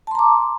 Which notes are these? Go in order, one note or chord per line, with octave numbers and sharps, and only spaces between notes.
A5 A#5 C6 D6